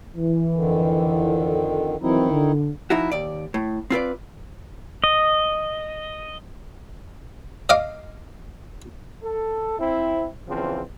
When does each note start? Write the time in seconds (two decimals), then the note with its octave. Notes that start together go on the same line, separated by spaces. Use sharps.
0.16 E3
0.54 F2 D3 D#3
2.01 D#3 E3 F#3 C4 D#4 E4
2.31 D3
2.90 F3 D#4 E4 F#4
3.12 D#2 D5
3.54 A2
3.90 C4 F4 B4 D5
5.04 D#5
7.69 D#5 F5 D6
9.23 A4
9.78 C4 E4
10.48 E2 C#3 E3 F3 C4